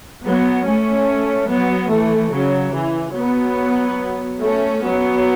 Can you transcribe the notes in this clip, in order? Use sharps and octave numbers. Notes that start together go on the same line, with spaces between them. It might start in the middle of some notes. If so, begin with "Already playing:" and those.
F#3 B3
A3 C#4
F#3 B3
E3 A3
C#3 F#3
E3
F#3 B3
A3 C#4
F#3 B3